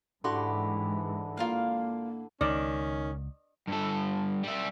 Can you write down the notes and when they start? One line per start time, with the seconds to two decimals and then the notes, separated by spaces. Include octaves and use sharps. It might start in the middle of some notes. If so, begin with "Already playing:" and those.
0.24 G#2 D3 E3 G#3 E4 F#4 G4 C6
1.37 A#3 F4 A#4 F5
2.41 C#2 D#3 C#4 D5
3.68 G2 A4
4.44 G3 E5